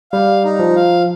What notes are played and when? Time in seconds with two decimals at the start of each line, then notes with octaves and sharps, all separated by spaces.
0.12 G3 F5
0.44 D#4
0.59 F3
0.76 F5